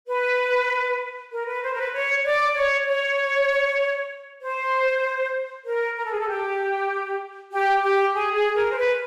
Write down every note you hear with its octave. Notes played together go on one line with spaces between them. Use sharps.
B4
A#4
B4
C5
A#4
B4
C#5
D5
C#5
C#5
C5
A#4
A#4
A4
G#4
A4
G4
G4
G4
G#4
G#4
A#4
C5
B4